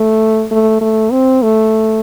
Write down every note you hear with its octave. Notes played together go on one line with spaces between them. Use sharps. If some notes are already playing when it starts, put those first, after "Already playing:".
Already playing: A3
A3
A3
C4
A3